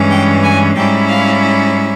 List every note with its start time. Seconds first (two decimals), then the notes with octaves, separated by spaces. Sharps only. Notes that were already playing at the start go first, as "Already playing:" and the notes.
Already playing: G2 E3 G#3 C#4
0.10 G5
0.43 G#5
0.75 G#2 G3 C#4 E4 G5
1.09 F5